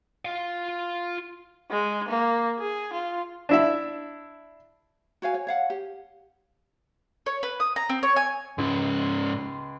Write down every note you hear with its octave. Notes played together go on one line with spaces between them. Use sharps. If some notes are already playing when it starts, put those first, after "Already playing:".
F4 F5
G#3
A#3
G#4
F4
D4 E4 E5
F#4 C#5 F5 G#5
C#5
C#5 F5 F#5
G4
C#5
B4
D#6
A#5
C4
C#5
G#5
C#2 G#2 C#4 C6